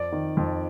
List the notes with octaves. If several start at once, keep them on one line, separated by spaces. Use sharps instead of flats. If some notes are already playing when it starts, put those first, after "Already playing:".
Already playing: F2 D5
D#3
F2